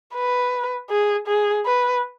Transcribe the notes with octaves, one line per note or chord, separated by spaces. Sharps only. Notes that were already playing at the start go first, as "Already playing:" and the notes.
B4
G#4
G#4
B4